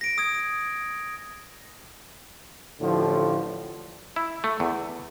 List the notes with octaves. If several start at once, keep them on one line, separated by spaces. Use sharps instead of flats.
A#6 D7
D#6 G#6
A1 A2 D3 F3
E4
A3
E2